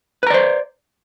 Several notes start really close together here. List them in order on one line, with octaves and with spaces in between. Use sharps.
B4 A#5 D5 C5